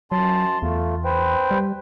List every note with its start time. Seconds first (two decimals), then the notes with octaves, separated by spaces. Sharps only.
0.12 F#2 F#3 A5 C6
0.62 E2 A3 F4
1.05 B4 C5 G5
1.51 G3